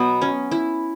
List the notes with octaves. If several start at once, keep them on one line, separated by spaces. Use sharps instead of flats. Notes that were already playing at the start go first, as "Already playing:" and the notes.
Already playing: B2 F#3 B3
C#4
E4